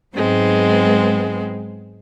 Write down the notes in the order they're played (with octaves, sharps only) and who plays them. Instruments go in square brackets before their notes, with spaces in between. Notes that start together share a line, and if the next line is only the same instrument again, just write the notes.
[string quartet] G#2 F#3 G#3 B3 C4